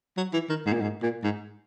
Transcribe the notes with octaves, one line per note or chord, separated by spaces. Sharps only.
F#3
E3
D#3
G#2
A#2
G#2
A#2
G#2